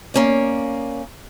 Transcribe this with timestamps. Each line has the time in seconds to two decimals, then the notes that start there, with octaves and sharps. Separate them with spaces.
0.14 A#3 C#4 D5